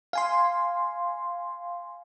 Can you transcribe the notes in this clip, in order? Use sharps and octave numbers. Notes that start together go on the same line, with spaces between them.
F5 G#5 C6